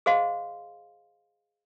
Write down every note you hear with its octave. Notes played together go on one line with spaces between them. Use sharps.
G#4 C5 D#5 F5 C6